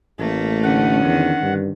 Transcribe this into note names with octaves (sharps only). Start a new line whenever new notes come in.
A1 A3 A#3
D3 C#4 F#5
E2 D#3
G2